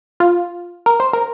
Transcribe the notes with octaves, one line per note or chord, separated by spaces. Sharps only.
F4
A#4
C5
A#4